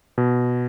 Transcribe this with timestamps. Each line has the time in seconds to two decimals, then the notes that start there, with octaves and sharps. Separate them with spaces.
0.18 B2